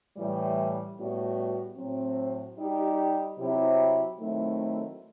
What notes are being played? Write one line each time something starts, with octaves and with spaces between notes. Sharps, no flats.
A2 E3 G3
A2 G3 B3 F#4
A2 F#3 C4
G3 D#4 G4
C3 F#3 C4 E4 G4
D#3 F#3 A3 C4 E4